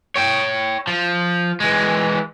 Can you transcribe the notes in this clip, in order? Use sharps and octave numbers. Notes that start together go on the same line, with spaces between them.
C#5 G5
F3
E3 G#3